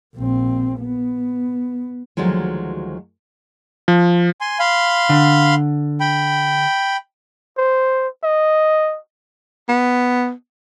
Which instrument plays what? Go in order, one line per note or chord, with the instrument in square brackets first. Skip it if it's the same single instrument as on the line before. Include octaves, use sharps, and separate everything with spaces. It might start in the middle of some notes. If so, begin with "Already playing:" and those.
[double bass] A#1 C4
B3
[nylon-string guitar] D2 D#3 F3 F#3 G#3
[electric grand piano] F3
[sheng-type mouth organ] G#5 C6
F5 B5 C6
[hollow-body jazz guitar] D3
[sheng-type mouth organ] G5 B5
[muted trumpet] C5
D#5
[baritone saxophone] B3